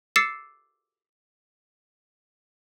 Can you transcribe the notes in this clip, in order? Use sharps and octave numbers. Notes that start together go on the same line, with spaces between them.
D6 E6 A6 C7 C#7 E7